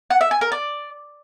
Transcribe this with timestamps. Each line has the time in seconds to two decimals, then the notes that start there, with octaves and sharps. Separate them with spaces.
0.10 F#5
0.21 E5
0.31 G#5
0.41 A#4
0.52 D5